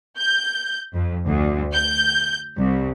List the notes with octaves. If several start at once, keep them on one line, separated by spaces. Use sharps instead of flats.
G6
F2
D2
G6
C2